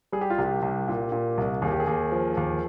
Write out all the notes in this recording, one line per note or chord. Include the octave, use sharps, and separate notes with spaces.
G3 G#4
G4
F4
C2 G4
C2
A#2
A#2
C2
D#2 G#4
G4
G#4
D#2
F3
D#2